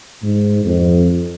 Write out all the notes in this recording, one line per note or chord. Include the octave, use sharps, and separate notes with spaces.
G#2
F2